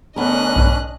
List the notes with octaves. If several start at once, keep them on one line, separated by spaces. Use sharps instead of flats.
D2 B3 C#4 D4 A#4 D#5 F#6
B1 G#2